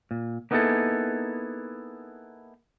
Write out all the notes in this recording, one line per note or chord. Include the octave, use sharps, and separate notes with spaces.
A#2
A#3 B3 D#4 E4 G#4 A4